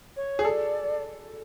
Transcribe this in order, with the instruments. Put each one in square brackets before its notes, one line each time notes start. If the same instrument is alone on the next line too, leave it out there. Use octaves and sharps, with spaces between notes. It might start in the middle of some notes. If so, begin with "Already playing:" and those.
[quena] C#5
[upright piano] G#4
[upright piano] A4 [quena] D5